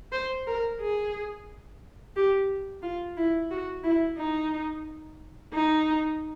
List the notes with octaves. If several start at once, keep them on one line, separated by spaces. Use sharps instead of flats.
C5
A#4
G#4
G4
F4
E4
F#4
E4
D#4
D#4